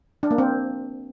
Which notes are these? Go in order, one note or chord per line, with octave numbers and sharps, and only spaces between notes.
D4
A#3
C4